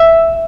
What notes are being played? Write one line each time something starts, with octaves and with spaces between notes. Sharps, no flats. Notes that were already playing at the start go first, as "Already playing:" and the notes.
Already playing: E5